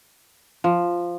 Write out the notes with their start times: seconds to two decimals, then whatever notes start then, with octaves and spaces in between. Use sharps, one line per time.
0.64 F3